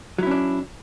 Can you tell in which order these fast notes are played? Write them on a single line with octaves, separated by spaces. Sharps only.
F#3 E4 C#4 D4